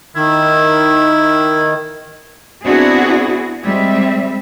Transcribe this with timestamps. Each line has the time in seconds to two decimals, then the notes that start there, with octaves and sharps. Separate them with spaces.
0.16 D#3 E4
2.66 B3 C4 D4 E4 F#4 G#4
3.64 G3 G#3 C4 E5